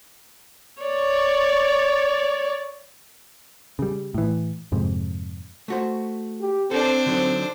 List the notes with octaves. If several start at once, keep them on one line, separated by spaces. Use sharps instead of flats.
C#5 D5
C#3 G3
A2 E3
F2 G#2 C3
A3 F#4 C5
G4
C4 D4 A4 C5
D3 F#3 D#4